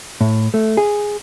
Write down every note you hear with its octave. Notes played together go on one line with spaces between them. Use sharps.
A2
A3
G#4